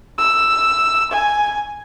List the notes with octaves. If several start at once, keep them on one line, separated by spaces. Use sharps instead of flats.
E6
G#5